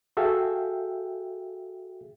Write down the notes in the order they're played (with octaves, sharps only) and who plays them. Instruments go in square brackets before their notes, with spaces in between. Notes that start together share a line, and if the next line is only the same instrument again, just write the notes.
[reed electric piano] F#4 G#4 A4 E5 F5 G5